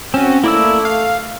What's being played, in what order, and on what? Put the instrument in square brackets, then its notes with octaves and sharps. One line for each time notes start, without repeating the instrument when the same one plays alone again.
[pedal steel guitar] C4 F#4 [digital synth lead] C#4
[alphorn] A3 [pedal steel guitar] A#3 D5 E6 [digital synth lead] E4
[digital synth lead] F5 [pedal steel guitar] F6